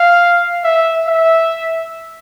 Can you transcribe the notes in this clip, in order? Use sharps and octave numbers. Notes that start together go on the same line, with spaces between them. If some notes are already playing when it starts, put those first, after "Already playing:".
Already playing: F5
E5
E5